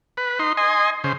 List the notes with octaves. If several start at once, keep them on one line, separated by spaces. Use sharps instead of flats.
B4
D#4 C6
D#5 G#5 C6
C#3 C5